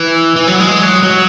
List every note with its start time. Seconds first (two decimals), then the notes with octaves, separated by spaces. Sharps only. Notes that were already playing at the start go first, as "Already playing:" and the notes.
Already playing: E3
0.36 E3
0.48 F#3
0.60 G#3
0.82 F#3
1.03 F#3